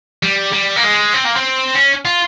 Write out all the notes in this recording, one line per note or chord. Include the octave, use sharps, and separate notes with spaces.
G3
G3
A#3
G#3
C4
A#3
C4
C#4
F4